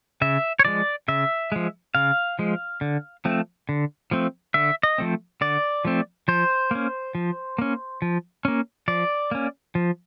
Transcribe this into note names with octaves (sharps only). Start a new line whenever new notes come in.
C#3 E5
C#5
F3 G#3 D5
C#3 E5
F3 G#3
C#3 F5
F3 G#3
D3
F3 A3 C4
D3
F3 A3 C4
D3 E5
D#5
F3 A3 C4
D3 D5
F3 A3 C4
F3 C5
A#3 C#4
F3
A#3 C#4
F3
A#3 C#4
F3 D5
A#3 C#4
F3